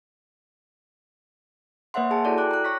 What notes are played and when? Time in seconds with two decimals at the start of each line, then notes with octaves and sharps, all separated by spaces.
1.94 A#3 B4 C#5 E5 F#5 C6
2.11 G#4 G#5 A5
2.25 E4 F#4 A4 D5
2.37 G5 D6 F#6
2.51 A#5 F#6
2.64 C#5 C#6 A#6 B6